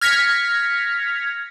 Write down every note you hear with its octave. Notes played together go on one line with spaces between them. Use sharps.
F6 G#6 A#6 B6 C#7